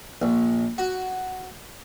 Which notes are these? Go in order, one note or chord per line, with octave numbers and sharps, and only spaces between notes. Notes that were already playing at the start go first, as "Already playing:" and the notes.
A#1
F#4